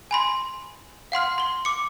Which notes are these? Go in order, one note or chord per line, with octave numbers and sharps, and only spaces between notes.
G#5 B5 C6
F5 F#5 C6 F6
C6 G7
D6 C#7